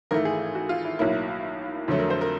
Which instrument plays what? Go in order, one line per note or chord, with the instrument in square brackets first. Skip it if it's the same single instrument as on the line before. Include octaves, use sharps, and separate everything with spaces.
[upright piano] G#1 G#2 E3 A3 A#4
G#4
F#4
F4
E4
B1 A2 F#3 A#3 E4
F2 D3 F#3 A3
A#4
C5
A#4